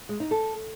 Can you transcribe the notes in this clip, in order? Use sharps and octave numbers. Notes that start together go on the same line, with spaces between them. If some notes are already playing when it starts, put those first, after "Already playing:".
G#3
D#4
A4